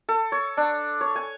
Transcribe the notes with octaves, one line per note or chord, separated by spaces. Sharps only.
A4
C#5
D4
C#5
G#5